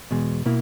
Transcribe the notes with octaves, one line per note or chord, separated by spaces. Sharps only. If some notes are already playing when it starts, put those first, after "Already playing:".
E2 B2 G#3
B2 A#3 E4